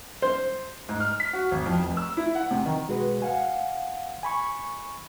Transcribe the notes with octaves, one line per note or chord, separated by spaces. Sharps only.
C5
G#2
F6
B6
F#4
G#1
F2
F1
E6
E4
F#5
C3
D#3
B2 G#3 F#4 G#4 B4
F5 F#5 G#5
G#5 B5 C#6